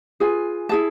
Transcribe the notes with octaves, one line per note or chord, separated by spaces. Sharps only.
F4 G#4 B4 G#5
E4 G#4 B4 A5